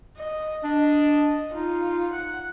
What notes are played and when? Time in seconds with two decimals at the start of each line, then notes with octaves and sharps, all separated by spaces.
0.17 D#5
0.64 D4 D#5
1.54 D#4 F4
2.14 F#5